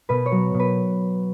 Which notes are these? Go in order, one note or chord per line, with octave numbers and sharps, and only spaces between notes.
B2 B4
C#5
F#3
B2
B4